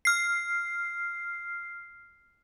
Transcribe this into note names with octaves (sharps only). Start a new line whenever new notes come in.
F6 C7